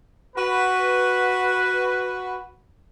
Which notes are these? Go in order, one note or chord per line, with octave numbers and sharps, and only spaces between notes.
F#4 B4